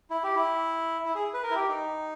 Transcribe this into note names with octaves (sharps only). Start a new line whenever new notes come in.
E4
G4
E4
E4
G#4
B4
A#4
E4
G4
D#4